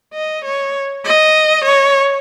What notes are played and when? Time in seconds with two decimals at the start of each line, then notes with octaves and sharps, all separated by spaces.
0.14 D#5
0.45 C#5
1.05 D#5
1.65 C#5